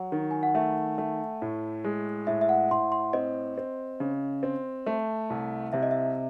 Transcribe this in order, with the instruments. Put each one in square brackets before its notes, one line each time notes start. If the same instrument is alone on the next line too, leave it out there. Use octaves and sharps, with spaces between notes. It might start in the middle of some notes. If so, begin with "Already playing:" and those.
Already playing: [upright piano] F#3 [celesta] F#5
[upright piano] D#3
[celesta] G#5
F#5
[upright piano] A3 [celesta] E5
[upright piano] A3
A2
G#3
[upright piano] A2 [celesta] E5
[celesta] E5
F#5
[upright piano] A2 [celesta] C6
[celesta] C6
[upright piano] C4 [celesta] D#5
[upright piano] C4
C#3
C4
A3
C2
[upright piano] C3 [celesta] E5
[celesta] D#5
E5